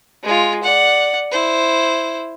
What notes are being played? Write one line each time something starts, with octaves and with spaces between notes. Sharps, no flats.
G#3 F4
D5 F#5
E4 C5